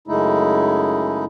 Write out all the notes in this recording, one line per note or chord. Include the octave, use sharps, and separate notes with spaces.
F#2 C#3 G#3 A3 D#4 E4